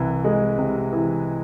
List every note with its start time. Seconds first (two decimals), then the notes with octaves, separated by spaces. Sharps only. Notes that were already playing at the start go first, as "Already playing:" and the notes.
Already playing: C2 C3 E3
0.25 G#3
0.58 C3
0.93 E3